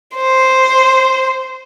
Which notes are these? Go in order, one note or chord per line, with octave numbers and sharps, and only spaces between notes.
C5